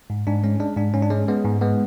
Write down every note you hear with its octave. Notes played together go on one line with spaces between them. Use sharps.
G#2
G#2 D4
G#3 C#4
G#3 D4
G#2 D4
G#2 C#4
D4
G#3 C#4
G#3 B3
G#2
G#3 B3